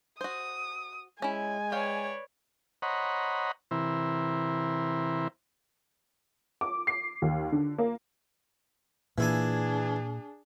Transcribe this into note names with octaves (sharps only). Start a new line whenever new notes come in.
F#4 C5 D#6
G#3 C#4 E4 G#5
B4 C#5 D5 F5 G5
C5 C#5 D#5 F#5 A#5 B5
C3 E3 E4 A#4 C5
D6
C7
D#2
D3
A#3
A#2 E3 D4 E4 G#4 G#5